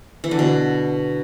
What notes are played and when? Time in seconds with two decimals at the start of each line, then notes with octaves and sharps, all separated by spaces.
0.24 E3
0.31 D3
0.39 B2